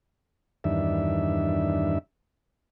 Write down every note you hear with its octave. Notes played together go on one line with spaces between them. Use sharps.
E2 G2 D#3 D4 E5